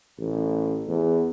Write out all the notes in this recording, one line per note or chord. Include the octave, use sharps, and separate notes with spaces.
A1
E2